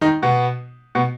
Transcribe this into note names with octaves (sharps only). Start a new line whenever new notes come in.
D#3 D#4
B2 B3
B2 B3